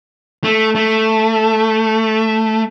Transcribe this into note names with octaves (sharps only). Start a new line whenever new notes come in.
A3
A3